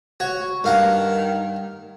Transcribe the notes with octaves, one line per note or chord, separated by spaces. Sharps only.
F#4 C#5
G2 D#3 F5 F#5